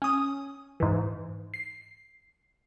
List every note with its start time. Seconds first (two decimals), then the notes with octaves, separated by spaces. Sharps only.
0.02 C#4 D#6
0.80 G#2 E3
1.54 C7